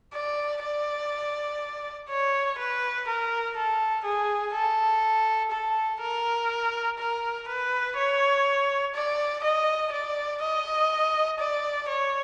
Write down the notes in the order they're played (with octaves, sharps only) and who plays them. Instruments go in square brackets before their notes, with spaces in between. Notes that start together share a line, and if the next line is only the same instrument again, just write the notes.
[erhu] D5
D5
C#5
B4
A#4
A4
G#4
A4
A4
A#4
A#4
B4
C#5
D5
D#5
D5
D#5
D5
C#5